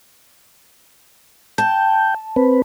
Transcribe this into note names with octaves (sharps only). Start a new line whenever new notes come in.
G5 A5
C4 B4